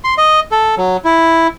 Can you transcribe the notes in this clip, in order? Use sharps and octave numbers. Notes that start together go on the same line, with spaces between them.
C6
D#5
A4
F#3
E4